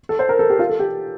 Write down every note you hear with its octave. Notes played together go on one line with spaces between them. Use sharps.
A4
C5
A#4
A4
G4
F4
A4
G4